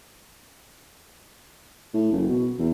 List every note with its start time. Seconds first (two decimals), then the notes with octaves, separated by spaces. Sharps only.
1.93 A2
2.12 F#1
2.29 B2
2.59 E2